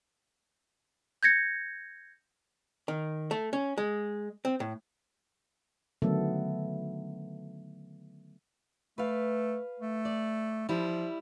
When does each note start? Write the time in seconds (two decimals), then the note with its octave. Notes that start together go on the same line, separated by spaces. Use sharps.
1.23 G6 G#6 A#6 C#7
2.88 D#3
3.31 A3
3.53 C#4
3.78 G#3
4.45 C4
4.60 A2
6.02 D3 D#3 F#3 A3 B3 A4
8.98 A3 B4 F5
9.79 A3
10.05 D5
10.69 F3 G3 E4